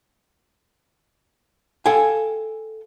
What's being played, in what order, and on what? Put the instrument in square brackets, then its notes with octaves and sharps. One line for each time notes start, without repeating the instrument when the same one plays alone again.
[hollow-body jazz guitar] A4 F5 G5 G#5